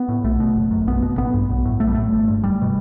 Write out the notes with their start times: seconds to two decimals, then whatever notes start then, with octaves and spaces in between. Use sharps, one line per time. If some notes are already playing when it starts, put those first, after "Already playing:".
Already playing: B3
0.08 A2
0.24 B1 A3
0.40 B2
0.56 F#1
0.71 F#2
0.87 B1 B3
1.02 B2
1.17 A1 B3
1.34 G2
1.49 B1
1.65 A2
1.80 B1 A3
1.87 G3
1.94 A2 A3
2.12 G1
2.28 G2
2.43 E1 G3
2.62 B2